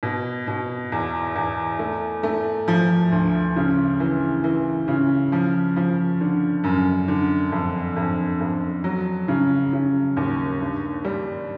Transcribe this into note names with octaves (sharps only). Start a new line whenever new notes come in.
B2
B2
E2
E2
A3
A3
F3
D2
C#3
E3
E3
C#3
F3
F3
D3
F#2
D3
F2
F2
F2
F#3
C#3
C#3
D#2
G2
G3